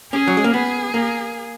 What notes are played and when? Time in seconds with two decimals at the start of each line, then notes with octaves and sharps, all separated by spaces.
0.13 C#4 G#4
0.28 F#3
0.37 G#3
0.44 A#3
0.54 B3 G#4
0.94 A#3